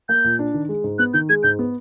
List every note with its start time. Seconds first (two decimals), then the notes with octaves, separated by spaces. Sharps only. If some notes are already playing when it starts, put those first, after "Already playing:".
0.09 A#3 G6
0.24 A#2
0.39 D4
0.54 D#3
0.69 G#3
0.84 G#2
0.99 B3 F#6
1.14 D#3 G6
1.29 G#3 G#6
1.43 G#2 G6
1.59 B3